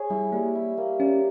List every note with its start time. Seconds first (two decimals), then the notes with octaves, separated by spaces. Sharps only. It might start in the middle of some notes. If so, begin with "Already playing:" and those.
Already playing: G#4 C#5
0.10 G3 E4
0.32 G3 A#3
0.55 E4
0.78 A#3
1.00 G3 C#4